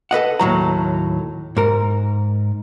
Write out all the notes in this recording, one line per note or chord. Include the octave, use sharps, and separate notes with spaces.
A4 B4 D#5 F#5
D#2 A2 F#3 A#5
G#2 A#4